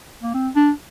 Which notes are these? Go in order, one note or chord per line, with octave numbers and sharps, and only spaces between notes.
A#3
C4
D4